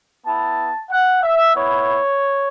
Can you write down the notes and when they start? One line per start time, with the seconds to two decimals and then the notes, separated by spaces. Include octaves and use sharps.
0.25 B3 E4 A5
0.90 F#5
1.22 E5
1.54 B3 E4 C#5